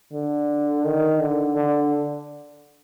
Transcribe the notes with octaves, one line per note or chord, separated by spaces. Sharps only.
D3
D#3
D3
D3